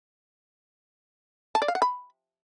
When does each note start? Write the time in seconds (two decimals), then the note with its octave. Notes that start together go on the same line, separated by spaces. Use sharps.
1.55 A5
1.62 D5
1.68 F5
1.75 F#5
1.82 B5